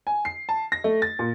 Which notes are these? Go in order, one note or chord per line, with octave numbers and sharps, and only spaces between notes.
G#5
C7
A5
A#6
A3
A6
A#2